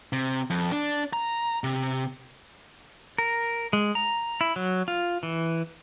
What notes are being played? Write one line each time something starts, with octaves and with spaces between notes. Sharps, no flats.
C3
F2
D4
A#5
C3
A#4
G#3
A#5
E4
F#3
F4
E3